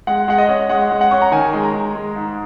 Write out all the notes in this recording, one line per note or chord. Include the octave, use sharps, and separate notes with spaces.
G#3 F#5
G#3 F#5
D#5
C#4
G#3 F#5
G#3
F#5
C#4 C#6
A#5
D#3 G#5
G#3
A#5
G#3
G#3
G#2